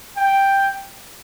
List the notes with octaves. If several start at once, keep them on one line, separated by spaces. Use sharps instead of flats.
G5